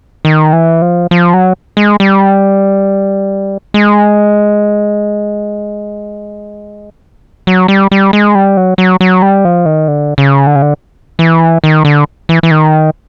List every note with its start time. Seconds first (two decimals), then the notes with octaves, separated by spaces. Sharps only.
0.25 D#3
0.53 E3
0.82 F3
1.11 F3
1.34 F#3
1.77 G#3
2.00 G3
3.74 G#3
7.47 F#3
7.68 G3
7.91 G3
8.13 G#3
8.35 G3
8.57 F#3
8.78 F#3
9.01 F#3
9.22 G3
9.45 F3
9.66 D#3
9.88 D3
10.18 C#3
10.47 D3
10.55 C#3
10.62 D3
11.19 E3
11.64 D#3
11.85 D3
12.29 E3
12.43 E3
12.51 D#3